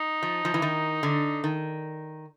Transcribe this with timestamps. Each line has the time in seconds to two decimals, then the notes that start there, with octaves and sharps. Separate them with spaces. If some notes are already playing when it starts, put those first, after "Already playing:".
Already playing: D#4
0.23 F3
0.45 F3
0.54 E3
0.62 D#3
1.03 D3
1.44 D#3